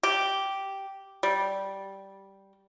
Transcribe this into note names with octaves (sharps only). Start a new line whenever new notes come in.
G4
G3